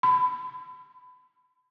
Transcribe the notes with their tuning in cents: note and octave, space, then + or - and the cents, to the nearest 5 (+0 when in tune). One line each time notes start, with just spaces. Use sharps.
B5 +30